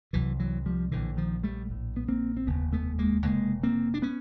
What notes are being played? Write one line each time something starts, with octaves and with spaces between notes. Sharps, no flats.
C2 C3 E3 F#3
E3 F#3
F3 G3
A#1 A2 D3 E3
D#3 F3
G3 A3
A#1 A2
B3
A#3 C4
C4
F1 D#2 C#3 B3
A3 B3
G#3 A#3
F1 D#2 C#3 G#3 A#3
A#3 C4
D4
B3 C#4